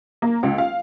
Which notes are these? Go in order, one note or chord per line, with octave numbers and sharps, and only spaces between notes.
A#3
C#2
F5